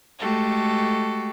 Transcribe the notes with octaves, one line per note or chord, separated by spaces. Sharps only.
G#3 A3 F#4 G4 A4